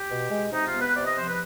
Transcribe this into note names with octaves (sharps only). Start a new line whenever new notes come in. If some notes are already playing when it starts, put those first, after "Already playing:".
Already playing: G4
B2
G#3
C3 D#4
F4
B3
B4
C3 D5
D#5
F3 C5
B4